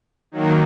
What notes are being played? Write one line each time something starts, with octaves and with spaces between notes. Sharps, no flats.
D#3 F#3 A#3